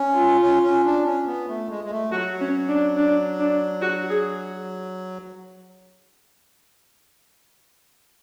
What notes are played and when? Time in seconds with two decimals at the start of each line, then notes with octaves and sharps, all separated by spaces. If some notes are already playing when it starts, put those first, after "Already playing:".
Already playing: C#4
0.13 F4
0.42 C#4
0.63 C#4
0.85 D4
1.05 C#4
1.27 B3
1.49 A3
1.70 G#3
1.84 G#3
1.91 A3
2.12 F#3 F#4
2.41 C#4
2.69 D4
2.97 D4
3.39 D4
3.82 F#4
4.10 G#4